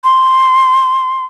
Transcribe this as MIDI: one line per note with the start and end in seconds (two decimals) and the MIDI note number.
0.04 1.25 84